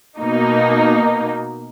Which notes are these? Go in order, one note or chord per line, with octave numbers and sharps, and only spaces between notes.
B2 A#3 D#4